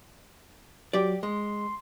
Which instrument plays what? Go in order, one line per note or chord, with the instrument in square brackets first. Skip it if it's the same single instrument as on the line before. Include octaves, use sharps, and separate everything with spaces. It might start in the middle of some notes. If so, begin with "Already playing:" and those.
[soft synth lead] F#3 [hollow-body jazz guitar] G4 D5
[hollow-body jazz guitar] G#3 [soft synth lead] C6